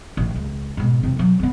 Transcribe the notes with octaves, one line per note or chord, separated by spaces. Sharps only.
A1
C#2
G#2 B2
E2 C3
B1 F#3
G2 B3